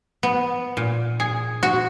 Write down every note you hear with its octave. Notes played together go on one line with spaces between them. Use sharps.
B3
A#2
G#4
F#4